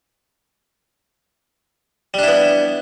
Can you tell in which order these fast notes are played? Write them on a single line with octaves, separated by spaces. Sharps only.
G3 D4 E4 B3